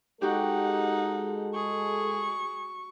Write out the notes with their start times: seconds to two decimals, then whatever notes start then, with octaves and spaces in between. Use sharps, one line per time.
0.22 G#3 D#4 F#4 G4 A4 F#5
1.54 G#4 C#6